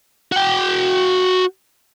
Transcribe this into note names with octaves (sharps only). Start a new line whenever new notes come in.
F#4 G5